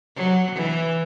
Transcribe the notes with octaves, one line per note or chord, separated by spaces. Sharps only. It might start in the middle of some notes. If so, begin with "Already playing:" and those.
F#3
E3